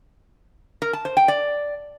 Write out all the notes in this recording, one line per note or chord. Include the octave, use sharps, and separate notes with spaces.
A#4
A5
C5
G5
D5